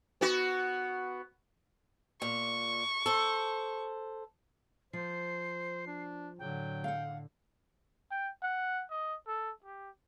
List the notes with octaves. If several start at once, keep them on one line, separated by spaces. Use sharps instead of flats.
B3 F#4
A#2 C#6
A4 C5
F3 C5 C7
D4
A2 D3 F#3 G5
F5 F#5
G5
F#5
D#5
A4
G4